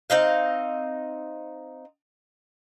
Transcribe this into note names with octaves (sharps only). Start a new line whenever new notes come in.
C4 D#4 D#5 F5